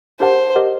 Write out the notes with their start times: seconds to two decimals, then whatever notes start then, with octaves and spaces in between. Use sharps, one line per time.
0.20 D4 G4 A#4 C5 F#5 A5
0.56 G4 A#4 D#5 F#5